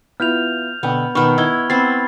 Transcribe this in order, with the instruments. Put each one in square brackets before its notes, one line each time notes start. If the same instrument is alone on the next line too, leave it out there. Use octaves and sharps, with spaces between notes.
[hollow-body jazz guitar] B3 E4 F4 [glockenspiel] F6 G6 F7
[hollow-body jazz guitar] B2 D3 G5 [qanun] B3
[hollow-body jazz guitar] B2 B4 [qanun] D#3 B3 [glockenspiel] C#6 F6
[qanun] E4 [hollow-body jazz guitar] D#5 [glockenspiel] E6 G#6 G7
[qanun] B3 C4 [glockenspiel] B5 A6 C7